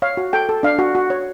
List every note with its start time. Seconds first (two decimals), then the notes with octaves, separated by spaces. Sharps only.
0.02 C#5 F5
0.17 F#4
0.33 A4 G5
0.49 A4
0.63 D4 F5
0.79 F#4
0.95 F#4
1.10 C#5